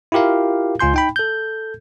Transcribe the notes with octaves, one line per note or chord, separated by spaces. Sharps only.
E4 F4 G4 A#4 F5
C#2 F4 G#5 C6 G6
D#4 G5 B5
A4 G6